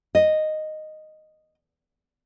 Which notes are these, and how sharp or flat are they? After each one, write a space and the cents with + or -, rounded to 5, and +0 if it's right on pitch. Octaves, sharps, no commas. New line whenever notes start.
D#5 -5